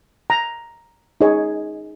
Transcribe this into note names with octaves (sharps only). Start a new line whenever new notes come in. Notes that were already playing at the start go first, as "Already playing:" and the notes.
A#5
D#4 G#4 C#5